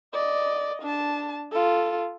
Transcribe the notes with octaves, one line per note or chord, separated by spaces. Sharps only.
D5 D#5
D4 A5
F4 A4